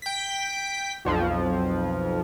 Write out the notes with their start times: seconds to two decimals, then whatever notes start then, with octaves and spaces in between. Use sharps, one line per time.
0.02 G5 B6
1.05 B1 F2 F3